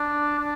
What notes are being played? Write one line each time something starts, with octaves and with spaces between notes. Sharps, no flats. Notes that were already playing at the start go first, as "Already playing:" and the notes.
Already playing: D4
D4